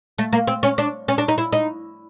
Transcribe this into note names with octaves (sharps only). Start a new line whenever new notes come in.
A3
A#3
C4
C#4
D4
C#4
D4
D#4
E4
D#4